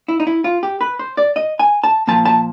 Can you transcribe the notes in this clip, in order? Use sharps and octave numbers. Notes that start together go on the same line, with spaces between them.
E4
D#4
E4
F4
G4
B4
C5
D5
D#5
G#5
A5
A#2 F3 A#3 A5
A5